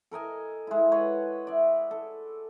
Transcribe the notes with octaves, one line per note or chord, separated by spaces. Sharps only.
A4 A#4 D#5 G#5
G#3 E4
B4 C#5 F#5 C6
D5 E5
A4